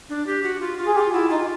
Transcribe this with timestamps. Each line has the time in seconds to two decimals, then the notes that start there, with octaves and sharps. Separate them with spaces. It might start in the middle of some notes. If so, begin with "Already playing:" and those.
0.09 D4
0.27 G4
0.43 F#4
0.60 F4
0.78 F4
0.87 G#4
0.95 F4 G4
1.13 E4 F#4
1.29 D#4 F4